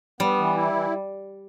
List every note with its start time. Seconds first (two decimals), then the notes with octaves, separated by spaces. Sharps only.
0.20 G3 B3
0.38 E3
0.54 E4
0.72 E3